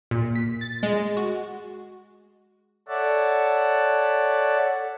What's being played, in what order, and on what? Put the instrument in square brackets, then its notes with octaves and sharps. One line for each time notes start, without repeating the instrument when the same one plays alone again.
[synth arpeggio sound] A#2
B6
A6
G#3
F#4
[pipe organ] A4 C#5 D5 E5 F#5 A5